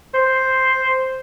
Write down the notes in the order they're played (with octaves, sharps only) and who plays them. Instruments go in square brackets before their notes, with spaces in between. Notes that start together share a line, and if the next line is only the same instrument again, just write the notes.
[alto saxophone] C5